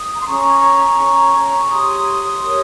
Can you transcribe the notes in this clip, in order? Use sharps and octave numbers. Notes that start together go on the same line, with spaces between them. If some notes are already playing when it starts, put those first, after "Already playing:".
Already playing: D#6
A#5
C6
C#4 G#4 C#5 A#5 C#6
C#4 G#4 C#5
G4 C#5 C6 D#6
G4 A#4 C#5